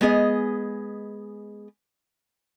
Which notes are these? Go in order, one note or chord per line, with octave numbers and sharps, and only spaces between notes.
G#3 B3 G#4 D#5